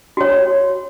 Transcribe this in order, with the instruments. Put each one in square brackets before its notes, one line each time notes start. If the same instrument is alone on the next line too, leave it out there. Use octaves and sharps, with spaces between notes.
[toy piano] F#4 C#5